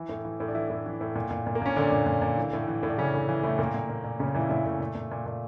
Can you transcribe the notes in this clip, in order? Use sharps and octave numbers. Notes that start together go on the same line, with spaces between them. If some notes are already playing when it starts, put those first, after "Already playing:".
Already playing: E3 E4
A2
E3
A2
D4
E3 E4
A2
E3
A2
A#2
A#2
A#2
A#3
A#2 C#4
A#2 D3 D4
A#2
A#2
A#2
E3
A2
E3
A2
D4
C#3 E3 C#4
A2
E3
A2 A3
A#2 A#3
A#2
A#2
A#2
A#2 C#3 C#4
A#2 E3 E4
A#2 E3 E4
A#2 A3
A#2
A#2
A#2
A#2